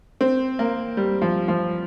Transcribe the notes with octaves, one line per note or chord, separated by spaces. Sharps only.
C4
A#3
G3
F3
F3